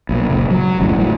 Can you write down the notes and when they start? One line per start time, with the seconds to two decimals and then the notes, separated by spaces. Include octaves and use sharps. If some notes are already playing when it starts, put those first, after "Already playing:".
0.09 B1 A#2
0.29 F#1 C#2 A#2
0.51 F#3
0.80 G1 C#2 F#2 A2
0.97 A2 F#3